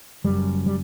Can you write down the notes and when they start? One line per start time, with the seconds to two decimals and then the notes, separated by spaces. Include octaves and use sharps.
0.24 F#1 F#2 G3
0.66 G3